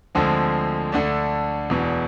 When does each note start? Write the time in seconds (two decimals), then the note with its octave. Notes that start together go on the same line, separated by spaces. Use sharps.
0.15 D2 D3 F3 G#3 C4
0.92 D2 D3 A3 D4
1.70 E1 E2 B2